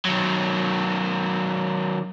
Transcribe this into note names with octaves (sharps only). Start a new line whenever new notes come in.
D#3 F#3